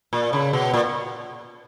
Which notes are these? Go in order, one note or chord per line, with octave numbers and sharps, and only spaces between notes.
A#2
C#3
B2
A#2